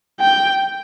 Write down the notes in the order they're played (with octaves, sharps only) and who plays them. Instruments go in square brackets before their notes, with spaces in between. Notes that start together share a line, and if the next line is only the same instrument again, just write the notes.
[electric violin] G5